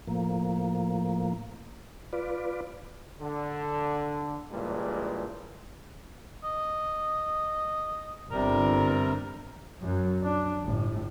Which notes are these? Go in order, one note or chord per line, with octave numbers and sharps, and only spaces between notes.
A2 F3 A#3
F4 B4 D5
D3
G2 A#2 C#3 E3 G3 G#3
D#5
G1 C3 G3 A#4
F#2 F#3
D4
G1 A2